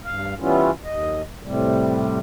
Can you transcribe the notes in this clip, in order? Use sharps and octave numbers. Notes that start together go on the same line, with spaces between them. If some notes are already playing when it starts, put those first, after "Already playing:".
G2 F5
E3 G3 B3 C#4 E4 F4
D#2 D#5
A2 C3 G3